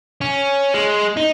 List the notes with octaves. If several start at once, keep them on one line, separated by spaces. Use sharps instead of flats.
C#4
G#3
D#4